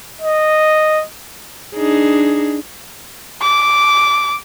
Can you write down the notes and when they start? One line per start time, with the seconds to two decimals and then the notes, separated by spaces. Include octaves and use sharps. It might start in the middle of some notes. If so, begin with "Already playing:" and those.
0.22 D#5
1.76 D4 D#4 G#4
3.42 D6